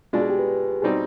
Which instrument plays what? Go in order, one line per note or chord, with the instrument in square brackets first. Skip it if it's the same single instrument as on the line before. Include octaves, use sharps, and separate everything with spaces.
[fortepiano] B2 G#3 D4 [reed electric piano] F4
[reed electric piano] G#4
G4
B4
[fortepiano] B2 G3 C4 D#4 [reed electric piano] G#4